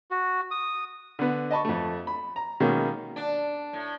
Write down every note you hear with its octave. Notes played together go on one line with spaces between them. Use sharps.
F#4
D#6
D3 B3
D#5 A5 B5 C#6
F2 A3
B5
A#5
B2 D#3 G#3 A#3 C#4
D4
A2